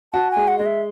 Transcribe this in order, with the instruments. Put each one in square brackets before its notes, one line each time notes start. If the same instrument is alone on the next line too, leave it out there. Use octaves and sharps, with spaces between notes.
[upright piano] F#4 [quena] A5
[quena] G#5
[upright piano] G#3
[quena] F#5
[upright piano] G#3 [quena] D#5
[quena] E5